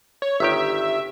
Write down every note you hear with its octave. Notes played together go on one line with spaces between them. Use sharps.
C#5
G1 D#3 G4 E5